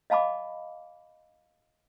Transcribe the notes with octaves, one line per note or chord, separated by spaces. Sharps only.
D#5 F5 A5 B5 D6